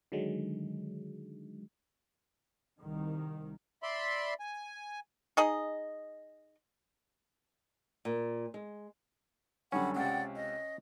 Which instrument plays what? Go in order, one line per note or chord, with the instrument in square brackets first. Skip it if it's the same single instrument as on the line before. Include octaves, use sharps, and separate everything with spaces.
[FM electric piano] D3 D#3 F#3 G#3
[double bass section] C2 D#3
[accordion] D5 E5 B5 C6
G#5
[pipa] D#4 G#4 D#5
[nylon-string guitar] A#2
G#3
[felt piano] F#2 D3 G3 [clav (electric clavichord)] C#4 [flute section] F#5 B5
[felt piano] C#2 C3 [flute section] D5 F#5 G5
[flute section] D#5